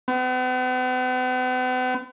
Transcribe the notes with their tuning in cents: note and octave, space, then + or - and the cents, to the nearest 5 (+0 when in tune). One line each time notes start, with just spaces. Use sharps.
B3 +45